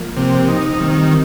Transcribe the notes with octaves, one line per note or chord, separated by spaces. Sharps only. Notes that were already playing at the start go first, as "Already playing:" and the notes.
Already playing: F3 A#3
C3
D#4
D#3 G3 C4